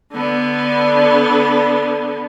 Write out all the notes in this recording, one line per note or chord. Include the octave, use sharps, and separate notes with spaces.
D3 B3